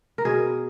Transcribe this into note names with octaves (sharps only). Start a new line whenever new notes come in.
A#4
B2 G#4